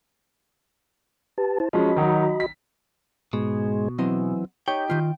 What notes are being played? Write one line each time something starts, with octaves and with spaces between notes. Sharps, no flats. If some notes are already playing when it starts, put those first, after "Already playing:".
G4 B4 A5
E4 C5 A5
F3 G#3 C#4 F#4 D#5 B5
D#3 F#3 D#4
B6
G#2 B2 G#3
E3 F#3 C4 D#5
D#4 G4 C#5 G5
D#3 F4